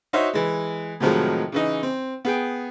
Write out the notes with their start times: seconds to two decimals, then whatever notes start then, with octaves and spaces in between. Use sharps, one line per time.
0.13 D#4 F#4 C5 C#5 E5
0.33 E3 G#3
1.00 A2 C3 D#3 F3 F#3 G#3
1.52 C#3 E3 D#4
1.83 C4
2.25 B3 G#4 G5